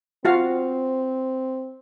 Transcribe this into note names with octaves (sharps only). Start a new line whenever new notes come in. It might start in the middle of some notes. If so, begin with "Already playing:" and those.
C4 F4 F#4 F5